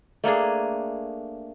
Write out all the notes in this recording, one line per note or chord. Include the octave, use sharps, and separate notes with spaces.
A3 A#3 D4 G#4